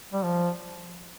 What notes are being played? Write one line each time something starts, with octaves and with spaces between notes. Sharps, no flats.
G3
F3